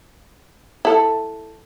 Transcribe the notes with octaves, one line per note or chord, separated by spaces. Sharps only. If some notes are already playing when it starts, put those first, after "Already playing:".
E4 A4